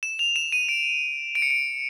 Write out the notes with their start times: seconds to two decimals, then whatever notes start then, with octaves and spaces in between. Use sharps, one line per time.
0.03 E7
0.19 F7
0.36 E7
0.52 D#7
0.69 D7
1.35 D7
1.42 C#7
1.50 D7